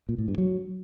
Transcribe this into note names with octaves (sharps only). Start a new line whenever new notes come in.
A#2
A2
G2
F#3